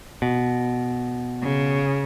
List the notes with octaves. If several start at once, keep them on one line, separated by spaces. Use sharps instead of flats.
B2
C#3